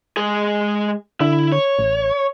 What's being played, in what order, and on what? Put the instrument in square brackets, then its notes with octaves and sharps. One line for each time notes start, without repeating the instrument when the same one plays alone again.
[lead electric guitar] G#3 G#4
[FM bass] D3 [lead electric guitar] E4
[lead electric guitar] C#5
[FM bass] A1